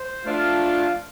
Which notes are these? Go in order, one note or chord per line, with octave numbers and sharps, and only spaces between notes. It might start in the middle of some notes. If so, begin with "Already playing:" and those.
Already playing: C5
F3 A3 D4 F4